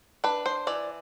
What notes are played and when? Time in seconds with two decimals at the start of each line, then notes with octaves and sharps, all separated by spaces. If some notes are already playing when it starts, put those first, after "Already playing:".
0.24 D4 B4
0.46 C5
0.67 E3 D5